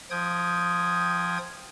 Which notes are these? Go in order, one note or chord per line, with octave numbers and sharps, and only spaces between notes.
F3 G5 D#6 G#6